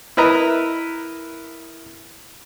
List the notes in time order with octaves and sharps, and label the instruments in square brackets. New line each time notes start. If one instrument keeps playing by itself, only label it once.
[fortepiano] E4 A#4 B4 D#5 A#5